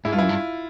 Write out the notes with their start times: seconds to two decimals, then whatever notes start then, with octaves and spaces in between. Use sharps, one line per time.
0.05 G#2 E4
0.12 G2 F4
0.18 F#2 E4
0.29 G2